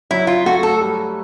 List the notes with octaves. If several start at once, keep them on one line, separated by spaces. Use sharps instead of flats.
F#3 E4
F4
A3 F#4
A4
G3